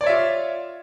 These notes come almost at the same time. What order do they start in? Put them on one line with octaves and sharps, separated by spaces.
D5 C#5 E5 F4